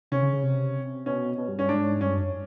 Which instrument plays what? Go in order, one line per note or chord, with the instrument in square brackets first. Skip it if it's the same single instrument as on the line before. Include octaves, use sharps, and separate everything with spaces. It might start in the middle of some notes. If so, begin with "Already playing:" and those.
[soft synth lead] C3 [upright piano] C#4
[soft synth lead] C#3
C#3
C3
[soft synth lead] B2 [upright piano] C#4
[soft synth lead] B2
G2
[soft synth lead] G2 [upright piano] C#4
[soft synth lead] G#2 [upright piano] D4
[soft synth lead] G2 [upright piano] C#4
[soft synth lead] F#2